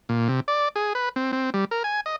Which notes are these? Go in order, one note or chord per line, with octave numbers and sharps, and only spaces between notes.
A#2
C3
D5
G#4
B4
C4
C4
G3
A#4
G#5
D#5